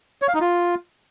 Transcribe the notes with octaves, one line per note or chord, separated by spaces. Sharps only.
C#5
F5
D#4
F4